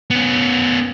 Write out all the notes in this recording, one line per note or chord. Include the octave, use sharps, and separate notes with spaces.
B3 C#4